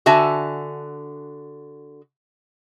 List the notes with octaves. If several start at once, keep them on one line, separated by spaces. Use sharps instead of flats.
D3 F#4 E5 G#5 A5